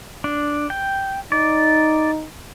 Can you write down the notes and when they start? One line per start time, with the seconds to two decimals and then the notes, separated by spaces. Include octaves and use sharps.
0.24 D4
0.70 G5
1.32 D#4 D5